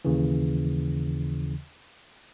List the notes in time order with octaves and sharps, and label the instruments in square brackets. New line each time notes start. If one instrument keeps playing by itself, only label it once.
[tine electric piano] D#2 C#3 E3